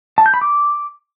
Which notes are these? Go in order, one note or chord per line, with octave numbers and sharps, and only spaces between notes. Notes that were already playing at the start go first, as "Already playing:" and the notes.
A5
G6
B5
D6